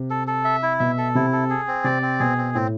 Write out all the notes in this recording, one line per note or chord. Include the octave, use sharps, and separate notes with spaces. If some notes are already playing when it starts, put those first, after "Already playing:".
Already playing: C3
A4
A4
E5
E4
B2 E5
A4
C3 E4
A4
G#4
C4
C3 D5
C4
B2 G#4
C4
A2 C4